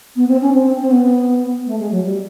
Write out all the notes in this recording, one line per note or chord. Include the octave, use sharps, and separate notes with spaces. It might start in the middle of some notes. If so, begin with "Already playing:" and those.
B3
C4
C#4
C4
C4
B3
A3
G#3
F#3
G3